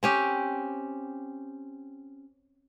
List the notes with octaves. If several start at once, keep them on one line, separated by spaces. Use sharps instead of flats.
C4 C#4 G4